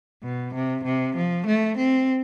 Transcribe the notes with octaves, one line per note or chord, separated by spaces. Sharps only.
B2
C3
C3
F3
A3
C4